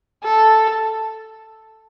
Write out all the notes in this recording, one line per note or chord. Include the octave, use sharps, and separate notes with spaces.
A4